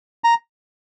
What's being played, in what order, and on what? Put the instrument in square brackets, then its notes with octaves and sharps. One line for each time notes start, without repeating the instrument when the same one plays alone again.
[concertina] A#5